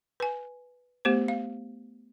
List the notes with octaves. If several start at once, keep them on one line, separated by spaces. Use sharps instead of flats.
B4 G#5
A3 B3 G4 C5
F5